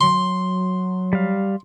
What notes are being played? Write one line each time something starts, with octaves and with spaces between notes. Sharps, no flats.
F#3 C6
G3 F5